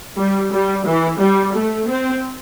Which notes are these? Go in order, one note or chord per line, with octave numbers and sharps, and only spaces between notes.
G3
G3
E3
G3
A3
C4